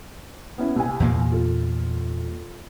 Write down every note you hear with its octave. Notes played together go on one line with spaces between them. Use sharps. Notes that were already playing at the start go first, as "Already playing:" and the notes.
B3 C#4 E4
C2 G#5
E2 A#2 A#3
F4 A4